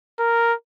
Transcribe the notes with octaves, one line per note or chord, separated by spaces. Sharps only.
A#4